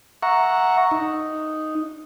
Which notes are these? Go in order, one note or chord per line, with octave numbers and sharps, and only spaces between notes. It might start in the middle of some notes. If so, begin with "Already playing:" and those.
E5 F#5 A#5 C#6
D#4